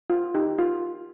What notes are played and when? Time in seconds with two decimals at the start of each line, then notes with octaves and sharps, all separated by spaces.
0.10 F4
0.34 D#4 G4
0.58 F4